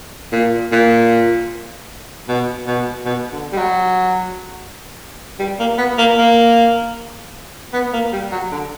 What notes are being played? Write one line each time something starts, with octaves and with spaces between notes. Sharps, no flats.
A#2
A#2
B2
B2
B2
D3
G3
F#3
G3
A#3
B3
A#3
A#3
B3
A#3
G3
F#3
D3